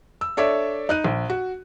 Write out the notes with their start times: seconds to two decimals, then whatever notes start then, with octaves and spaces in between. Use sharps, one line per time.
0.21 E6
0.37 D4 A4 C#5 D5 E5
0.89 D#4 F#6 D#7
1.05 A#1
1.30 F#4